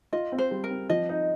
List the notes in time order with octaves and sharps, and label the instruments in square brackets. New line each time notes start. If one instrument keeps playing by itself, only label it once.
[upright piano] F4 [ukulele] D#5
[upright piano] C4
[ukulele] C5
[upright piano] G3
[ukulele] A#4
[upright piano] C4
[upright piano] F3 [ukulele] D#5
[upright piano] D#4